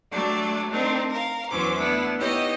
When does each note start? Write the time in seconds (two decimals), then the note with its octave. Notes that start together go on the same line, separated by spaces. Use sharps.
0.11 F#3 G3 A3 D4 D5
0.71 A3 C4 D4 D#4 A#4
1.09 A#4 F5
1.49 E2 E3 F#3 C#4 C5 D6
1.78 A3 B3 D4 E4
2.18 B3 D#4 E4 G4 C#5 D#5